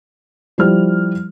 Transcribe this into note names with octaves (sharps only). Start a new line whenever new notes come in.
F3 G3 E4 G4 C5 F6